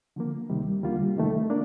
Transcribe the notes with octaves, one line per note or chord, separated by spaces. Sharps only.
D3 F3 A#3
D2 C3 D#3 G3
D#2 D3 G3 A#3 F4
C2 C3 D#3 A3
A#3 D4